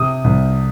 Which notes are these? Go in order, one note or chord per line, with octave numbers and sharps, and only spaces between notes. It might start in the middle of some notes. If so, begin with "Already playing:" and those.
Already playing: C3 D#6
C2